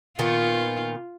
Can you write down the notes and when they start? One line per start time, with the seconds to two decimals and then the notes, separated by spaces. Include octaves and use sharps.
0.19 A#2 D#3 B3 F4